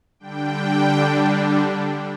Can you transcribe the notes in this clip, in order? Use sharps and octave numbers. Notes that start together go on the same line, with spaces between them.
D3 G3 D4 G5